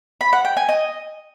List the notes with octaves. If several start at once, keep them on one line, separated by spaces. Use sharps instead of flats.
B5
F#5
G5
G#5
D#5